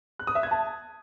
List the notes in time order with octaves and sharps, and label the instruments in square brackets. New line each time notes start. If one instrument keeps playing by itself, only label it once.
[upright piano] F#6
D#6
E5
G#6
A5